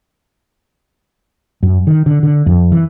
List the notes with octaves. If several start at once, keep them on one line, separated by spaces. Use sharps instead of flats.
F#2
D#3
D3
D3
F2
E3